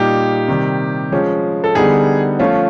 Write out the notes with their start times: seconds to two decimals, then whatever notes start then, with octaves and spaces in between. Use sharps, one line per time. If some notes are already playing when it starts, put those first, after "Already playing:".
Already playing: A#2 G3 A#3 D#4 G4
0.48 C3 D#3 G3
1.12 F3 G#3 C#4
1.64 A4
1.75 D3 G3 B3 D#4 G#4
2.40 F3 A3 C#4 F4